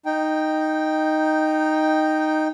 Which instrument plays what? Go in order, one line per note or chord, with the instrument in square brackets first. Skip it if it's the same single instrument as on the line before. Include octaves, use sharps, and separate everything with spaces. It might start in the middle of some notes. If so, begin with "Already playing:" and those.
[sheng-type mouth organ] D#4 G5